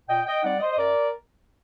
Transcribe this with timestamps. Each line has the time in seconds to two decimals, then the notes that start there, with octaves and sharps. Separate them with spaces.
0.09 A#2 D#5 G5
0.26 D#5 G5
0.43 G3 C4 D#4 D5 F#5
0.60 C5 D#5
0.71 D#5
0.78 F#2 A#4 D5